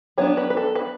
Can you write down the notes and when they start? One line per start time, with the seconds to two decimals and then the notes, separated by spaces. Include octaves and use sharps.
0.18 F#3 B3 D4 C#5
0.37 B4
0.50 B4
0.57 A4
0.75 B4